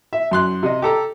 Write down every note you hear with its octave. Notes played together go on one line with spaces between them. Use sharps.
E5
F#2 C6 F#6
C3 D#5
G4 A4 A#5